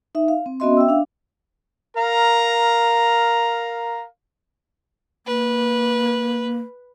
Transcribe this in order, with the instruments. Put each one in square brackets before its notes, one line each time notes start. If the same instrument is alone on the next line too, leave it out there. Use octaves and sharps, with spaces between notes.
[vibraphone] D#4 E5
F5
C4
B3 C#4 F#4 D#5 E5 C6
E5 G5 E6
D4 F5
[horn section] A#4 F5 A#5
[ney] A#3 [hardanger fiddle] B4